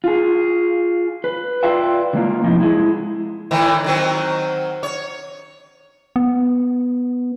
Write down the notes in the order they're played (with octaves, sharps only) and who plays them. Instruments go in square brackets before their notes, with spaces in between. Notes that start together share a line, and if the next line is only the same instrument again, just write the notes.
[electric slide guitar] F4 G#4
B4
F4 B4 D5 E5 F5 G5
C#3 G#3 A#3 F4
A2 C3 F3 D#4
G#3 E4
[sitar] A2 D#3 E3
D#3 F#3 C4
C#5
[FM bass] B3